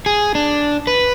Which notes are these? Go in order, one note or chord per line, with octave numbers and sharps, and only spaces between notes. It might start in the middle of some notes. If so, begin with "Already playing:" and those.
G#4
D4
B4